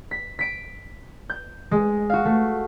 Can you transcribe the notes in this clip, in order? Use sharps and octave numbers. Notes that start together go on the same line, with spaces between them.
B6
B6 D7
G6
G#3
F#4 F5
A3